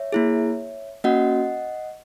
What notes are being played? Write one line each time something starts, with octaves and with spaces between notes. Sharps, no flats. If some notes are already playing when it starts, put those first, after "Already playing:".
Already playing: C#5 E5
A#3 E4 G#4
A#3 C#4 F#4 D#5 F#5